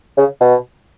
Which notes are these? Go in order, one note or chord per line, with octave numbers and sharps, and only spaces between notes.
C#3
B2